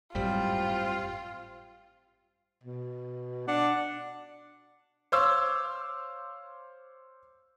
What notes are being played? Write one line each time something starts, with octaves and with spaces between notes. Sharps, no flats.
G#1 F#2 A2 G3 C4 F4
B2
D4 F#5
C5 C#5 F5 C6 D6 E6